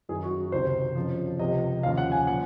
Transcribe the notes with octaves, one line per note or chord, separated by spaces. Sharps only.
F#2 D#3 G#4
F#4
C#2 C3 D#3 C5
F2 C#3 F3
C#2 C3 F3 D#5
D#2 C#3 F3 F5
F#5
G#5
A#2 F3 F#5